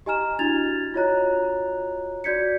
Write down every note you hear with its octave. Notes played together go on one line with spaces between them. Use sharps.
G4 D#5 G#5 A#5 F6 E7
D4 E4 F#4 G#6 A6 F7
F4 F#4 C#5 D#5 A#5 F#6
F#4 D5 G6 G#6 B6 C#7